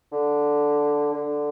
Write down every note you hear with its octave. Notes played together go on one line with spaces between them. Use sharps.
D3
D3